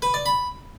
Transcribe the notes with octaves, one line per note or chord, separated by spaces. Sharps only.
B4
D5
B5